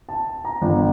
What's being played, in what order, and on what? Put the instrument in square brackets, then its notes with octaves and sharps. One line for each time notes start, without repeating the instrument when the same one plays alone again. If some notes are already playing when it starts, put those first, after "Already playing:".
[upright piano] A5
A#5
G1